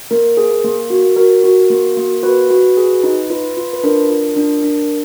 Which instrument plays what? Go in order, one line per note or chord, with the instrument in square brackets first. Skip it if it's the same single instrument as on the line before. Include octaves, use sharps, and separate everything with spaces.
[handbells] A#3 A#4
G#4
A#3
F#4
F#4 A#4
F#4
A#3
A#3
F#4 B4
F#4
G#4
D#4
F4 B4
F4
B4
D4 A#4
F4
D4
D4